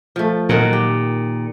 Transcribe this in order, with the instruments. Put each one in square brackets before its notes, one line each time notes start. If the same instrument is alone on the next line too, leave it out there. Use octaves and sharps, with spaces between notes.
[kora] F3 A3
[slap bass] A#2 [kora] D#3 F#3 A#4
[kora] G4